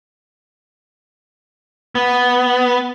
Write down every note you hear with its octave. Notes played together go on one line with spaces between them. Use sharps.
B3